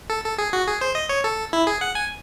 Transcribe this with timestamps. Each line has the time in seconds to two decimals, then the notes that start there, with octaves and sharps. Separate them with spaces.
0.10 A4
0.24 A4
0.38 G#4
0.53 F#4
0.67 G#4
0.81 C5
0.95 D#5
1.09 C#5
1.24 A4
1.53 E4
1.67 G#4
1.81 F#5
1.95 G#5